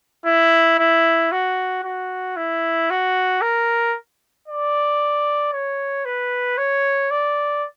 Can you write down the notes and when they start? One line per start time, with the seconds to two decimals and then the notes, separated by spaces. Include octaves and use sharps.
0.26 E4
0.79 E4
1.32 F#4
1.84 F#4
2.36 E4
2.90 F#4
3.42 A#4
4.48 D5
5.52 C#5
6.05 B4
6.58 C#5
7.11 D5